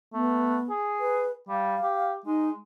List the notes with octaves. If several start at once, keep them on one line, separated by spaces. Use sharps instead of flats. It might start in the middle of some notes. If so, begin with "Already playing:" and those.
A3 B3
G#4
B4
G3 F5
G4
G#3 D#4